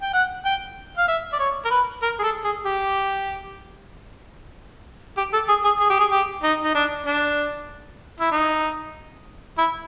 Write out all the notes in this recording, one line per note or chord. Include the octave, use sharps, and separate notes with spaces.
G5
F#5
G5
F5
E5
D5
C#5
A#4
B4
A#4
G#4
A4
G#4
G4
G4
A4
G#4
G#4
G#4
G4
G#4
G4
D#4
D#4
D4
D4
E4
D#4
E4